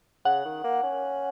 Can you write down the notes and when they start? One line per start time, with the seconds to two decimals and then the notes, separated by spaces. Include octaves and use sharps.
0.25 C#3 F#5
0.45 D#3
0.64 A#3
0.83 C#4